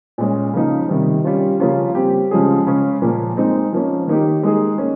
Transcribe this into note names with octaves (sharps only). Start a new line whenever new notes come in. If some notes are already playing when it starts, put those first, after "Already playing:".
A#2 G#3 C#4
C#3 F3 A#3 D#4
C3 D#3 G3
G3 C#4 F4
C#3 F3 A#3 C#4 F4
G3 C4 G4
C#3 F3 G#3 C#4 G#4
C#3 G#3 C#4
A#2 F3 A#3
G#3 C4 D#4
F3 A#3 C#4
D#3 A#3 D#4 G4
G#3 D#4 G#4
A#3 C#4